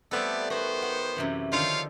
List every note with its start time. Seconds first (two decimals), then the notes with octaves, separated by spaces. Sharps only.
0.11 G3 A3 B3 C4 A4 D5
0.50 D#3 B3 F#4 C5
0.82 F#5
1.16 F#2 C3 E3
1.52 D3 D#3 F3 F4 C#5 F5